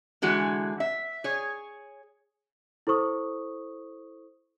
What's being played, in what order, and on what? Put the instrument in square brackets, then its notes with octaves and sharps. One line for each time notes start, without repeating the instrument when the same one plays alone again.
[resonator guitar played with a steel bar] D3 E3 G#3 F#4
E5
G#4 C#5
[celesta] E4 A4 C5 C#6 D#6